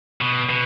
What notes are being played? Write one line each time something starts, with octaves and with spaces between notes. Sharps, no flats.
B2
B2